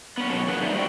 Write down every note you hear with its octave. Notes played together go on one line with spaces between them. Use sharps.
B3 C#4
B2 F#3 C#4 A4
A#2 E3 G#4 B4 F#5
A#3 D#4 B4 C5 D5 E5
G3 A3 F#4 G5